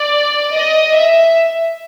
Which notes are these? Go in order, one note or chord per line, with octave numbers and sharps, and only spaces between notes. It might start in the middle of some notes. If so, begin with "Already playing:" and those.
Already playing: D5
D#5
E5